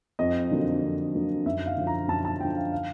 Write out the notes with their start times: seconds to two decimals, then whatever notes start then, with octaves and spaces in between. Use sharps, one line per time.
0.19 F2 D#5
0.51 D3 F#3 A#3
0.83 F2
1.14 D3 F#3 A#3
1.46 F#2 E5
1.66 F5
1.77 D3 F3
1.87 A#5
2.08 F#2 A5
2.25 A5
2.40 F3 G5
2.44 D3
2.56 F5
2.72 F5